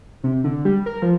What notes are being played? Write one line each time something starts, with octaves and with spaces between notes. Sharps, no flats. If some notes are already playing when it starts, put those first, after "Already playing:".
C3
D3
G3
A#4
F3